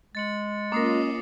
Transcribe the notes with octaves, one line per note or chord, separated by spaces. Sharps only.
G#3 A6 C#7 F#7
A#3 C#4 F4 A#4 D#5 D6 D#6 C7